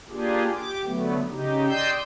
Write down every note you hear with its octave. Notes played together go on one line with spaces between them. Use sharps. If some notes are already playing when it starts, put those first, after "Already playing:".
A#3 D4 F4 G4 G#4
G4 D6
D3 F#3 A3 B3
C#3 D#4 G4
D5 D#5 G5 C6 E6 G6